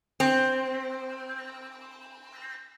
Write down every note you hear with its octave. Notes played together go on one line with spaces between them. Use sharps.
C4